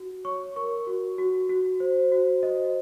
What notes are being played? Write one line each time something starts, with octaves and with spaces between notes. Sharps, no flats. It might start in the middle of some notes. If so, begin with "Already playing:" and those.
Already playing: F#4
C#5 C#6
A#4 C#6
F#4
F#4
F#4
C5
F#4
C5 D#5